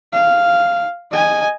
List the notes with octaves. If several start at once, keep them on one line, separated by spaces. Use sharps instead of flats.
F5
D#5 G#5